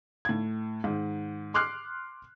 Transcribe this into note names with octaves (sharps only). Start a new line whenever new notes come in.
A2 G#6
G#2 D#3
C6 D6 F6 F#6 C7